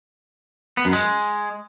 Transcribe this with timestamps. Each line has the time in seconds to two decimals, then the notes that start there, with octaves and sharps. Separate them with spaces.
0.77 B3
0.85 F#2
0.93 G#3